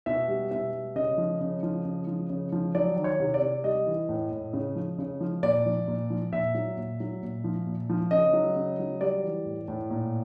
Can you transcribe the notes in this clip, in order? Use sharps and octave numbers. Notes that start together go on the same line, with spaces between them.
B2 E5
G3
B2 E5
G3
C#3 D#5
F3
C#3
F3
C#3
F3
C#3
F3
F#3 D5
D#3
C#5
C3
D5
C3
G3 D#5
E3
A2
A2
C#3
F3
C#3
F3
A#2 D5
F3
A#2
F3
A#2 E5
F#3
A#2
F#3
A#2
F3
A#2
F3
C#3 D#5
F#3
C#3
F#3
G3 D5
E3
A2
A2
A#2